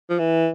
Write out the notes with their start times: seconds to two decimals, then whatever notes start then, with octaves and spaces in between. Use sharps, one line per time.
0.10 F3
0.19 E3